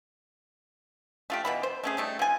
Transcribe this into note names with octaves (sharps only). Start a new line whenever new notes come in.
A3 F4 G4
B2 E3 B5
C5
A3 C#4 G#4
G3 A3 D#4
F3 G#5